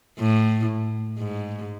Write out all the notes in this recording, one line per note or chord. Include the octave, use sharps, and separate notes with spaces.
A2
G#2